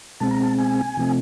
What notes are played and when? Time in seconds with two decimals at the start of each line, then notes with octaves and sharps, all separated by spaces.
0.20 B2 G#3 C4 A5
0.31 A#5
0.43 A5
0.58 G#5
0.97 C3 F3 A3 C4